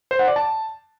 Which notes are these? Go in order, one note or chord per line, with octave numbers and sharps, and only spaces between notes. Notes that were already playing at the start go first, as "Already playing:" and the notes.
C5
F#5
D5
A5